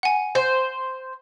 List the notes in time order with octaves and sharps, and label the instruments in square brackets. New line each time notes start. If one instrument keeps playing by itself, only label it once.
[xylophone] F#5 G#5
[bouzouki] C5